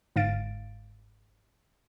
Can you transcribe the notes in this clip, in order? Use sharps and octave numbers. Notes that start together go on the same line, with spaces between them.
G1 G#2 F5 A6 D7